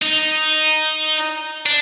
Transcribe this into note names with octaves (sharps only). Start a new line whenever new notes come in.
D#4
D4